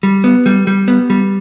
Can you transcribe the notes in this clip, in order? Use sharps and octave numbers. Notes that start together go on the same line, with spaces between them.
G3
B3
G3
G3
B3
G3